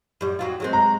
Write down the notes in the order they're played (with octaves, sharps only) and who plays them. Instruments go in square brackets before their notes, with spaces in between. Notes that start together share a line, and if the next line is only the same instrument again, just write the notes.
[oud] F#2 G3
F2 F#3 F4
F#3 G#3 C4
[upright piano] A#5